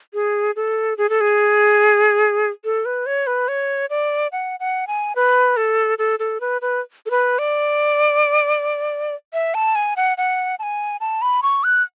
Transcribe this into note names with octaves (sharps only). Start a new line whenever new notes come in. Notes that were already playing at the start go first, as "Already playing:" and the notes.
G#4
A4
G#4
A4
G#4
A4
B4
C#5
B4
C#5
D5
F#5
F#5
G#5
B4
A4
A4
A4
B4
B4
A4
B4
D5
E5
A5
G#5
F#5
F#5
A5
G#5
A5
B5
C#6
F#6